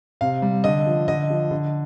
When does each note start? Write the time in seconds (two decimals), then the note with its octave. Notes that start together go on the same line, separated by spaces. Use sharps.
0.21 C3 F5
0.42 G3
0.64 D3 D#5
0.87 F3
1.08 D3 D#5
1.30 F3
1.51 D3